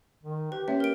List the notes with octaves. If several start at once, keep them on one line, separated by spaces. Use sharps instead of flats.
D#3
G4 B4
A#3 C#4 C#5 E5
A#4 D7